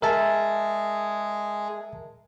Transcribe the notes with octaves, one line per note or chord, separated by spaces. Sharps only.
G#3 G#4 A#4 E5 A5